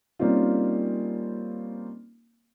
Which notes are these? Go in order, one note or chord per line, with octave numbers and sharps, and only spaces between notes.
G3 A#3 C4 C#4 D#4 F4